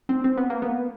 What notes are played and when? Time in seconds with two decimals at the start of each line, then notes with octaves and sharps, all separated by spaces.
0.09 C4
0.24 C4
0.37 B3
0.50 A#3
0.62 B3